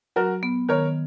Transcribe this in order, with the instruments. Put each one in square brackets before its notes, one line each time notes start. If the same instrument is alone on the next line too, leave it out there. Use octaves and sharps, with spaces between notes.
[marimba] F#3 [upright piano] F#4 A#4
[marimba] B3
[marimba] D#3 [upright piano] A#4 C#5